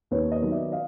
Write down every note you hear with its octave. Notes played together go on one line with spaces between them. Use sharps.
D#2 B4 C#5
C#5 D#5
D#3 F#3 B3
D5 E5
D#5 F5